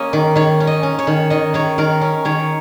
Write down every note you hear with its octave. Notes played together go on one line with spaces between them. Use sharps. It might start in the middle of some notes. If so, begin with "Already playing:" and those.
Already playing: A#3 C#4 C#5 D#5
D#3
D#3 C#5
C#4
D#5
C#4
C#5
D#3
D#3 D#5
D#3 C#5
D#3 A#4
C#4
D#3 C#5